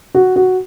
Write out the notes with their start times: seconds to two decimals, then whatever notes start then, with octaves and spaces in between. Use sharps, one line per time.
0.15 F#4
0.36 F#4